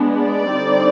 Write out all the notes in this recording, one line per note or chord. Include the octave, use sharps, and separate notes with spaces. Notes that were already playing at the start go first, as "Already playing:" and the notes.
Already playing: G#3 B3 D4
D5
D3 G3 C4 D#4